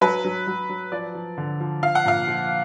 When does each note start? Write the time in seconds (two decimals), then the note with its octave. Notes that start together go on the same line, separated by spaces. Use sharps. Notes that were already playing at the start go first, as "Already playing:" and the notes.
0.01 F#3 B4
0.25 F#3
0.47 F#3
0.69 F#3
0.92 F3 D5
1.15 F3
1.38 D3
1.60 F3
1.83 F3 F5
1.95 F#5
2.05 A#2 F5
2.28 F3